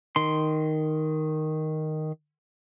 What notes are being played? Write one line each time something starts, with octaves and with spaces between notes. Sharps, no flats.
D#3 C6